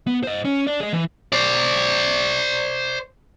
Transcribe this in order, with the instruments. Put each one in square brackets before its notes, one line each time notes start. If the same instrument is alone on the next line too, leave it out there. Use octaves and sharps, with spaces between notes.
[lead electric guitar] B3
C5 D#5
C#4
D4 D5
G#4 D#5
E3
[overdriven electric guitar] C5 D5